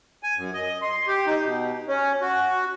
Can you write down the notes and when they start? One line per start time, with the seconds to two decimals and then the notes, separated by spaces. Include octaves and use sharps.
0.23 G#5
0.37 F#2
0.54 D#5
0.82 C6
1.07 G4
1.27 D#4
1.45 B2
1.88 C#4
2.22 F#4